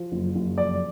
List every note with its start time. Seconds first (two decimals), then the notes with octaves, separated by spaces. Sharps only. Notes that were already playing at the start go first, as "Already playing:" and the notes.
Already playing: F3
0.12 F#1
0.35 F#1
0.58 F2 D5